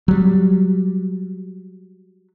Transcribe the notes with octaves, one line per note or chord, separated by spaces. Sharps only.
F#3 G3